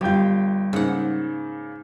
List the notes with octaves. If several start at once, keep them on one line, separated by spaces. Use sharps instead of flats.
G1 G3 F4 G5 G6
G#2 C#3 A#3 F#5